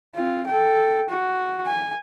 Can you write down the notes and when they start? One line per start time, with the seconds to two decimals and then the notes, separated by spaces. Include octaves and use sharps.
0.15 C4 F4
0.47 A4 G5
1.09 F#4
1.67 G#5